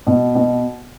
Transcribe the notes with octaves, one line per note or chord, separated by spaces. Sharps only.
B2
B2